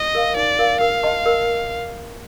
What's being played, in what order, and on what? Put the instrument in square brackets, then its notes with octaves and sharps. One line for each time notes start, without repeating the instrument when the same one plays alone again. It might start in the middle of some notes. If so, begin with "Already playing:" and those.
Already playing: [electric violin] D#5
[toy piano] A#4 F5
[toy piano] D#4 [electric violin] D5
[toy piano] A#4 F5
[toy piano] A#4 [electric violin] F5
[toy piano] D#5 A5 C6
A#4